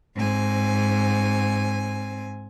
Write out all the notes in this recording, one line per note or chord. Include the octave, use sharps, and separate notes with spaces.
G#2 C4 G#5